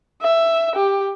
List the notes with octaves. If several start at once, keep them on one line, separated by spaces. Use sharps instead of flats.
E5
G4